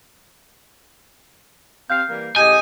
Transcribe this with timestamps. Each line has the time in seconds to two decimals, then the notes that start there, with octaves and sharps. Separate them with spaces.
1.90 C4 G4 F5 G6 C7
2.08 E3 G3 A#3
2.36 A2 C#3 G4 D#5 G#5 G6 G#6